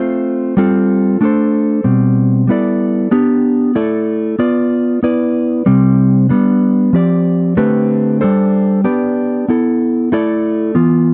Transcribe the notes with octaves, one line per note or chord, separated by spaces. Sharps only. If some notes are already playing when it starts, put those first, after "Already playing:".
Already playing: A3 C4 F4 C5
G3 C4 F4 A4
A3 D4 A4 C5
B2 G3 C4
G3 B3 E4 A4 D5
B3 D4 G4
A3 E4 A4 D5
B3 F4 B4 D5
B3 E4 B4 D5
C3 G3 C4
G3 B3 D4
F3 C4 G4 D5
D3 A3 C4 G4 B4
G3 D4 A4 C5
B3 D4 G4 B4 D5
B3 E4 A4
A3 E4 A4 D5
E3 B3 F4